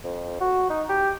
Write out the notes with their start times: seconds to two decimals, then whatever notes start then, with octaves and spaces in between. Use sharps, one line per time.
0.04 F2
0.41 F#4
0.70 D#4
0.89 G4